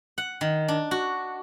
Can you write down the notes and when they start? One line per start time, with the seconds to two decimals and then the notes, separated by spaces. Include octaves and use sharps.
0.18 F#5
0.41 D#3
0.68 D4
0.91 F#4